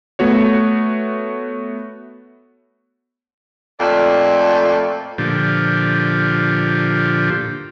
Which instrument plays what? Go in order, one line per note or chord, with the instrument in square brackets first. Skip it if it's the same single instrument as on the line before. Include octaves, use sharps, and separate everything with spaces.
[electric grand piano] A3 B3 F#4 C#5
[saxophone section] F2 A#2 A3 D5
[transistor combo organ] A#2 D3 F3 G4